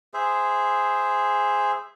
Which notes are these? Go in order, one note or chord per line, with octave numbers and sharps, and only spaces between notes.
G#4 C5 E5